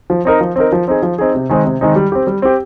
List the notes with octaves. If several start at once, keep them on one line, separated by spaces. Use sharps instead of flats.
F3
C4 D#4 A#4
F3
C4 D#4 A#4
F3
C4 D#4 G#4
F3
C4 D#4 G#4
C3
D#3 G#3 C4 D#4
C3
D#3 G#3 C4 D#4
G3
C4 G4
G3
C4 G4